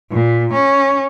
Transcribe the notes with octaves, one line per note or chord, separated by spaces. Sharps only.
A#2
C#4